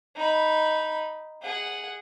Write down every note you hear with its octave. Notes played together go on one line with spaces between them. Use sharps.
D#4 B5
G#4 F#5